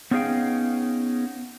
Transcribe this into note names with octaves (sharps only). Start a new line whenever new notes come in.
B3 C#4 D#4 G#4 F5 G5